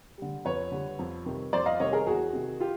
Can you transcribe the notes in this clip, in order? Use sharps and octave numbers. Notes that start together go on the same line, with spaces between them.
D3 G3
F2 B4 C#5
D3 G3
F2
C3 D#3 G3
F2 C5 D5
D#5 F5
C3 D#3 G3 C#5 D#5
G#4 A#4
E2 F#4 G#4
C3 D#3
F4 G4